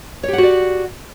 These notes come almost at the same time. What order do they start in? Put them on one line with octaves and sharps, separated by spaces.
C#5 G4 F#5 F#4 D5